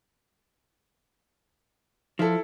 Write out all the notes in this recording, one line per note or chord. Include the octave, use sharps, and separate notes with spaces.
F3 E4 A4